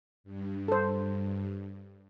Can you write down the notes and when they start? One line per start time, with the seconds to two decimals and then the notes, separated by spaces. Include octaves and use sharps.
0.24 G2
0.68 A4 C5